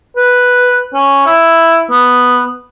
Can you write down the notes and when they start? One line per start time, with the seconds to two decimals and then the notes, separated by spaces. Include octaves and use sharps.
0.16 B4
0.93 C#4
1.26 E4
1.90 B3